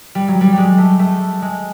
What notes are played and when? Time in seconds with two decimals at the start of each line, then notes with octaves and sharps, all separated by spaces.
0.15 G3
0.28 F#3
0.41 G3
0.53 G3 G#3
0.78 A3
0.99 A3
1.42 G#3